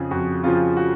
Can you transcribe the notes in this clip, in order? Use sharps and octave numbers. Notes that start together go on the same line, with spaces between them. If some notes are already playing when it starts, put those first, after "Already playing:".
Already playing: F2 C#3 F3 G#4
F2 F#4
C#3 F3 F4
F#4